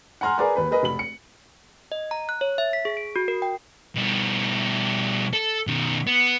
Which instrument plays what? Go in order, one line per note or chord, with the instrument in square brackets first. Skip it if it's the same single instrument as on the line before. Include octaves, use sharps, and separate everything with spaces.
[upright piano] F#5 G#5 A#5 C6 F6
G#4 A#4 B4 D5 G#5 A#5
D#2 B4 B5
G#4 A#4 B4 D#5
F1 B5 F#7
C#7
[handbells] D#5
A#5
F#6
C#5
E5
B6
G#4
D7
F#4
A#4
G5
[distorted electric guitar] B2 G3
A4
B2 D#3
B3